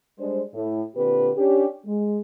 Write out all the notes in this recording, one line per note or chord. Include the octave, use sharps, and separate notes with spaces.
G3 G#3 D4 C5
A2
A#2 D3 C4 G4 B4
C#4 D4 G4
G#3